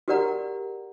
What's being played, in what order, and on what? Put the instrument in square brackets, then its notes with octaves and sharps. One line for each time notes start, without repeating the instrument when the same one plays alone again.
[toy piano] F#4 G4 A#4 D5 F#5 A#5